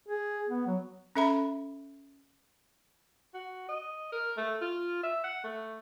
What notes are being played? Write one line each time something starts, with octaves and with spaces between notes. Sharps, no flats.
G#4
B3
F#3
C#4 A4 E5 A#5 B5
F#4
D#5
A#4
A3
F4
E5
F#5
A3